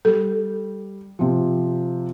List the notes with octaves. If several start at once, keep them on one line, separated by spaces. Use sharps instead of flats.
G3 A4
C3 F3